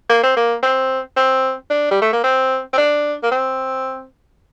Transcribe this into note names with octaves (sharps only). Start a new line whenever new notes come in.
A#3
C4
A#3
C4
C4
D4
G3
A3
A#3
C4
C4
D4
A#3
C4